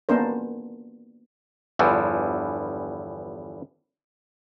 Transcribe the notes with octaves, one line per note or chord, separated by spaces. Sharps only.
A#3 B3 C#4 D4 A#4 C5
G1 E2 G2 E3 F3